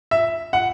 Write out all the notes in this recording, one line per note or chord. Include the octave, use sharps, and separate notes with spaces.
E5
F#5